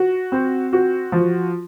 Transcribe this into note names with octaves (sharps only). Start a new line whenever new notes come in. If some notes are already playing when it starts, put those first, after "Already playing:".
Already playing: F#4
C4
F#4
F3